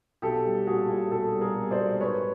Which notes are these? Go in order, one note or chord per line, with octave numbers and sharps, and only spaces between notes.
B1 G4 A4
G3
A#2 F#4 G#4
A#2
B1 G4 A4
G3
G#4 A#4
B1
C5 D5
B1
G#2 B4 C#5